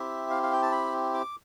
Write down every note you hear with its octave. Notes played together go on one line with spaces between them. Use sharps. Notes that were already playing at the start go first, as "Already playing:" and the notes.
Already playing: C4 E4 G4 E5
F5
F5
G5
A5
B5
D6